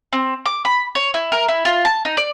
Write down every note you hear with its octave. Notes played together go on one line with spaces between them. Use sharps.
C4
D6
B5
C#5
E4
A#4
E4
F4
A5
D#4
D5